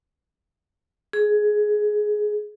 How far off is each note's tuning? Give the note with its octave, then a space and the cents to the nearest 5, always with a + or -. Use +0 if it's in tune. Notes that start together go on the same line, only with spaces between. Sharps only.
G#4 +15